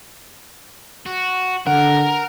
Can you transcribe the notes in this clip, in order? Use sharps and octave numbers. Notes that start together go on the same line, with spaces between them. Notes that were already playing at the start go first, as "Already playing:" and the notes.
F#4
D3 A#4 F#5